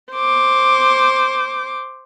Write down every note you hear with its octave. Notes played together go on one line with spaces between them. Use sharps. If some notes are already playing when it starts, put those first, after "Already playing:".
C5 D6